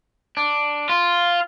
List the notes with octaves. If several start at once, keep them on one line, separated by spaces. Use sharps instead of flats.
D4
F4